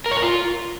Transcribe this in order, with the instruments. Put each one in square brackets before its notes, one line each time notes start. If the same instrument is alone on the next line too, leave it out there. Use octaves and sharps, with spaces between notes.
[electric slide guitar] A#4
C#5
A#4
F4